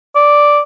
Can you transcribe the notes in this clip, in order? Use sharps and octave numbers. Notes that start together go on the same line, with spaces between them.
D5